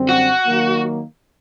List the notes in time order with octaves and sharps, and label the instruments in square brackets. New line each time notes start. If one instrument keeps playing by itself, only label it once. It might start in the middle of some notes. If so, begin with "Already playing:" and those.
Already playing: [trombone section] F#2 D3 G3 C4
[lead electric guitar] F#4
[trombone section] D#3 F#3 A#3